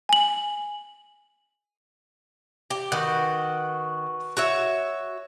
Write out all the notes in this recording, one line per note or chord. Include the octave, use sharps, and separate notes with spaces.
G#5 F#7
G4
D#3 F#4 B4 F#5
F#4 C#5 E5